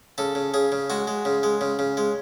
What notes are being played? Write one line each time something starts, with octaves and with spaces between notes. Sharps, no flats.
C#3 A4
C#3
C#3 G#4
C#3
G#3 F#4
G#3
C#3
G#3
C#3
C#3
G#3